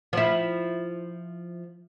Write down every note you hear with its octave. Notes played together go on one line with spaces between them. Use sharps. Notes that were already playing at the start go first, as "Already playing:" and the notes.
F3 E4